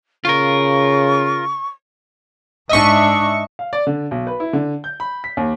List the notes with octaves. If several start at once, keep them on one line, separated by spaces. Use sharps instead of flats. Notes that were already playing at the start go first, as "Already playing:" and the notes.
C#3 F4 A#4 C#6
G#2 D4 D#5 E5 C#6
F5
D5
D3
B1
B4
E4
D3
G6
B5
B6
D#2